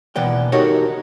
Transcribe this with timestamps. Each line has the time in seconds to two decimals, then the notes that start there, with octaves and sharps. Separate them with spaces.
0.16 D#2 B2 E3 B3 D5 G5
0.52 D#4 F#4 G4 A4 A#4 C#5